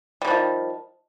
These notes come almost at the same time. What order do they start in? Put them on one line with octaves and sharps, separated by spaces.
G3 D3 F3 D#3